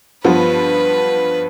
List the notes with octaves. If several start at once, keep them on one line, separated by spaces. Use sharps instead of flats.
G2 F3 B3 B4